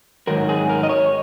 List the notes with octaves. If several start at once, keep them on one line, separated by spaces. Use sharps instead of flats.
G#2 D#3 F#3 A#4
G#4
A#4
D#5
C#5